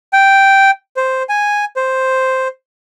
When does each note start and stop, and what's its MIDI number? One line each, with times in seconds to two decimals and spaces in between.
0.13 0.71 79
0.97 1.23 72
1.29 1.65 80
1.76 2.48 72